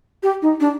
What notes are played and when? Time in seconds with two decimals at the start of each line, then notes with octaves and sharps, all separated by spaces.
0.23 G4
0.42 D#4
0.60 D4